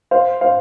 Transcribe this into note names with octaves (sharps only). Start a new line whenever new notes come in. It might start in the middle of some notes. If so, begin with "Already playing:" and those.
C5 F5
C5 F5